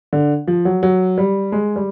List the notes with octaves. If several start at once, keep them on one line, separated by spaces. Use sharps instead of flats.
D3
F3
F#3
F#3
G3
G#3
G3